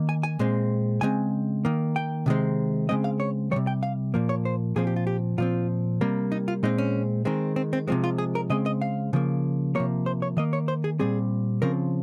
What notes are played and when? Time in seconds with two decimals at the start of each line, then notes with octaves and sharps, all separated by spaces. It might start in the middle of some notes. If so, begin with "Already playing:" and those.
Already playing: D#3 A#3
0.09 G#5
0.23 G#5
0.39 A#2 G#3 C4
1.01 C#3 G#3 C4 G#5
1.65 D#3 A#3
1.96 G5
2.26 C3 D#3 G#3 C4
2.89 C#3 G#3 C4 D#5
3.04 F5
3.20 C#5
3.51 D#3 G3 C#5
3.56 C3
3.67 G5
3.83 F5
4.14 A#2 F3 A#3
4.29 C#5
4.45 C5
4.76 A#2 F3 C4 G#4
4.87 G4
4.96 F4
5.07 G4
5.38 A#2 F3 C4 F4
6.01 C3 G3 A#3
6.32 D#4
6.48 F4
6.63 A#2 G#3 C4 D#4
6.78 C#4
7.25 D#3 G#3 C4
7.56 C4
7.73 C4
7.88 C3 F3 G#3 C4
8.04 F4
8.18 G#4
8.35 A#4
8.50 C#3 G#3 C4 D#5
8.66 D#5
8.81 F5
9.13 C#3 F3 A#3
9.75 C3 F3 A#3 C#5
10.06 C5
10.22 C#5
10.37 D#3 A#3 D#5
10.53 C#5
10.68 C5
10.84 G#4
10.99 A#2 G3 C4 G#4
11.62 C#3 F3 C4 A#4